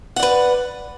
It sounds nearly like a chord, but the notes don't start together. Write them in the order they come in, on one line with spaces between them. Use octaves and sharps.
F#5 D5 B4